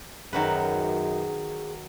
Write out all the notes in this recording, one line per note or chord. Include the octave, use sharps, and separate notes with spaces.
F#2 D#3 F#3 G#4 B4